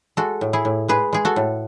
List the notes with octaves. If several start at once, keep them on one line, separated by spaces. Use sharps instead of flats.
G#3 F#4 A4
A2
E4 G#4
A2
G#3 G#4 B4
G#3 G#4
F#4 A4
A2